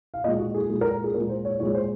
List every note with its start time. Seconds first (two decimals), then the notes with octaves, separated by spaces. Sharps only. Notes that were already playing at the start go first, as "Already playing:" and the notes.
0.14 F5
0.24 A#2 G#3 D#5
0.39 F#4
0.54 G#4
0.69 A#2 G#3 G#4
0.81 A#4
1.04 G#4
1.14 A#2 G#3 A#4
1.29 C5
1.45 C#5
1.60 A#2 G#3 C#5
1.75 C5